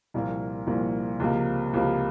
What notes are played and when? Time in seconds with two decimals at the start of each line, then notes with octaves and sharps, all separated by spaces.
0.14 C2 A#2 F3 A#3
0.67 C2 A#2 F3 A#3
1.20 C#2 C3 F3 A#3
1.74 C#2 C3 F3 A#3